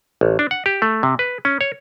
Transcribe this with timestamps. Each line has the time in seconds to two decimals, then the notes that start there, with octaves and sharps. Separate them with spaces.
0.21 A1
0.39 D4
0.51 F#5
0.66 G4
0.82 A3
1.03 C3
1.19 B4
1.45 C#4
1.61 C#5